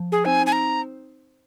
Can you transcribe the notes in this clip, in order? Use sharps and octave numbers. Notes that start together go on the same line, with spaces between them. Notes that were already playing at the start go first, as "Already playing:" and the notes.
Already playing: F3
G#4
C4 D#4 C5 G#5
G#5
A#5